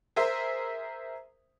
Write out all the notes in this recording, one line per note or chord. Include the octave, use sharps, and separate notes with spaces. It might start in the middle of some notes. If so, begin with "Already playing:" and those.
G#4 A#4 C5 E5